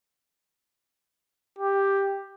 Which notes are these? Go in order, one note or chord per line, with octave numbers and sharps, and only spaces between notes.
G4